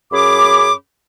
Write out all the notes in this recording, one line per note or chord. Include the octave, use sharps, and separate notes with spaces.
F#2 C#4 G#4 B5 D6